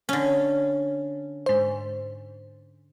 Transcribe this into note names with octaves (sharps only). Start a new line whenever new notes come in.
D3 C#4
G#2 C5